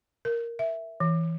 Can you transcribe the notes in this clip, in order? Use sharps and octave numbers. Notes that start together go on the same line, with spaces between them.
A#4
E5
E3